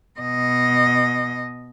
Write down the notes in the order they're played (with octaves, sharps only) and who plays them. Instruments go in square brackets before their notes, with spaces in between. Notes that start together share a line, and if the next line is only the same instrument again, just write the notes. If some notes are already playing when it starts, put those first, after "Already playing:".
[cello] B2 D#5